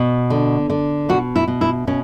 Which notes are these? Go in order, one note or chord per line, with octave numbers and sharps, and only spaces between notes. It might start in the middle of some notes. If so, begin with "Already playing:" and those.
Already playing: B2
D3
D3
B2 F#4
E4
B2
E4
B2 C#4